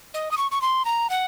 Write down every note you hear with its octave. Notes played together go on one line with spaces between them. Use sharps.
D#5
D#6
C#6
C#6
C6
A#5
F#5